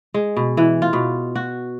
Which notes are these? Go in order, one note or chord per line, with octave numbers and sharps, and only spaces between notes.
G#3
B2
E3
F4
B2
F#4